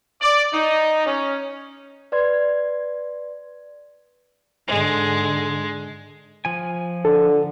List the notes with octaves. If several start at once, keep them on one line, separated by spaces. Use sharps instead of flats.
D5
D#4
C#4
B4 D5 C6 G#6
G#2 D3 G#3
F3 G#5
D3 A4